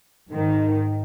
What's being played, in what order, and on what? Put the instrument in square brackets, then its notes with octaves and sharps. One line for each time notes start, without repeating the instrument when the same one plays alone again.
[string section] G#2 D#3